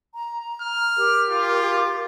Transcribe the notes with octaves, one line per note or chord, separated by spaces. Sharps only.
A#5
F6
G4 A#4
F4